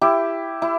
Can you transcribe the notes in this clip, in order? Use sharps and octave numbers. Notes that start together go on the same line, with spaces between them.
E4 G4
E4